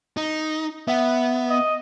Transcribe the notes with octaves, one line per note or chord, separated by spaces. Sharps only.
D#4
B3 E5 F#5
D#5